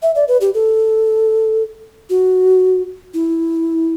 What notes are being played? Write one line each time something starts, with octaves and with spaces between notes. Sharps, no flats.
E5
D5
B4
G4
A4
F#4
E4